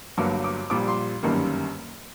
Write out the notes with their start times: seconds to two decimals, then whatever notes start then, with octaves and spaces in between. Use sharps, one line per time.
0.17 G1 G2 F#3 A#3 D6
0.44 D6
0.70 A#1 A#2 G3 D6
0.88 C6
1.23 G1 F#2 D#3 G3 A#3